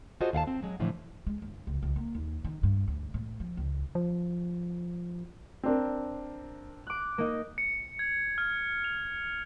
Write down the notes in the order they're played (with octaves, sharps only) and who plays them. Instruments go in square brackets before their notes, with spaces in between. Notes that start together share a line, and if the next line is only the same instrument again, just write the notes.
[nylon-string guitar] F4 F#4 G#4 A4 C5 D#5
D#2 F5 F#5 A5
C4
F#3 G#3
A2 D3 E3 F3
[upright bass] G#3
G1
C#2
C#2
A#3
D#2
D#3
G2
D2
A2
F3
C#2
[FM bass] F3
[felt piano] C4 D4 A#4
[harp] D6 F#6
A#3 D#4
[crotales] C#7
G#6
F6
F7